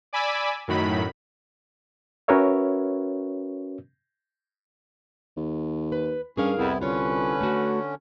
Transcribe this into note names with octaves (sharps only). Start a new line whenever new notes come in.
D5 G#5 B5 D6 E6
F#2 A2 D#3 F#3 B5
C#4 F#4 A#4 B4 C#5 E5
D#2
B4
G2 C#4 G#4 A#4 F5
C2 F2 B3 E4
D3 C#4 F4 B4 C#5
A3 F#4